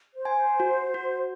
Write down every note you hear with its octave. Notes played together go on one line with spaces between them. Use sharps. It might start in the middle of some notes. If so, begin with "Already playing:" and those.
C5
G#5
C5
F#4
F#4